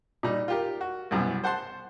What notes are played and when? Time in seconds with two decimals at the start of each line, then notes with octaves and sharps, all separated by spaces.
0.23 A#2 G3 D#4
0.48 F4 G4 A#4
0.81 F#4
1.11 C2 F#2 B2 E3 B3
1.44 C5 F#5 A5 C6